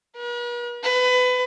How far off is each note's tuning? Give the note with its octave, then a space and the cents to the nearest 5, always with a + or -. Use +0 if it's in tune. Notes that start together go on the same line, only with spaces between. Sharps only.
B4 -45
B4 +25